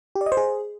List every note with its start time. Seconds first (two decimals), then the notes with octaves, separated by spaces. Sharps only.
0.16 G4
0.21 D5
0.26 D#5
0.32 C5
0.37 G#4